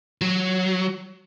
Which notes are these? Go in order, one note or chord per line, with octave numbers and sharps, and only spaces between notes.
F#3